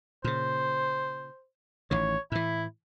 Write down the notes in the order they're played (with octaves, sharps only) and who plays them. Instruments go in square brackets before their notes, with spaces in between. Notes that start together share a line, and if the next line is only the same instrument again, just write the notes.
[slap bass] A#2 C#3 [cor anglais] C5
[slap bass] A1 D#3 [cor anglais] C#5
[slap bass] A2 E3 [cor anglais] E4